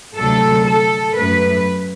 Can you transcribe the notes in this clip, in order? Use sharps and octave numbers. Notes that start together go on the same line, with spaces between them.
D2 C3 F#3 A4
A4
F#2 F#3 A3 B4